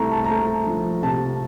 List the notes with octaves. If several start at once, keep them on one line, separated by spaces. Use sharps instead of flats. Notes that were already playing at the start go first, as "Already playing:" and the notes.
Already playing: C2 A3 A#5
A5
A#5
A3 A5
F3
C3 A5